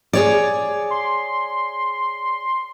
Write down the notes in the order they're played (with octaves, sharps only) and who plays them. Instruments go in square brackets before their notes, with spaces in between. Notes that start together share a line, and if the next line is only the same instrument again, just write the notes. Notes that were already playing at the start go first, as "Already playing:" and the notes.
[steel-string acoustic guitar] G#4 C#5 D5
[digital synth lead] C6